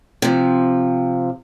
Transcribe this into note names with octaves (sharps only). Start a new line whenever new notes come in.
C3 F3